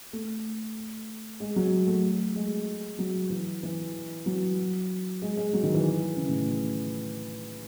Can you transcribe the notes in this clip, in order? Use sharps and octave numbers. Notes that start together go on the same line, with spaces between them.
A3
G#3
F#3
A3
G#3
F#3
E3
E3
F#3
G#3
G#3
F#3
D#3
E3
C#3
A2